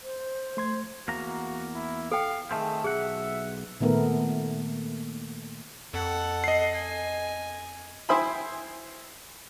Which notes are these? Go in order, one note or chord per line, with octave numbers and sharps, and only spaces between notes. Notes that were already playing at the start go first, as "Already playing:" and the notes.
C5
A3 C6 G#6
E2 A#3 F#4 A#5
E4
A4 F5 G5
D#3 A3 C4 G#4
B1 G#4 E5 F#5
A#2 D#3 A3 B3 A#4
F2 A4 F#5
D#5 C7
G#5
E4 C5 E5 G5 G#5 B5